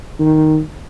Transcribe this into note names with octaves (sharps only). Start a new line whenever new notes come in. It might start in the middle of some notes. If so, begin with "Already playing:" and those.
D#3